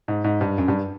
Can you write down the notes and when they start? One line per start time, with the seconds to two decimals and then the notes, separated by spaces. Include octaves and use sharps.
0.08 G#2
0.24 G#2
0.41 G2
0.58 F#2
0.68 G2